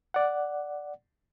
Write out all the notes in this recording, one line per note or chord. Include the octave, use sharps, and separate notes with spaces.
D5 F#5